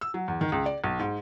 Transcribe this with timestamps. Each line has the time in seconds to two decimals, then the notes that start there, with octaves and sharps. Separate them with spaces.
0.01 E6
0.14 F#3
0.28 E2
0.41 D#3
0.52 C#2
0.66 D5
0.84 B1
0.99 G#2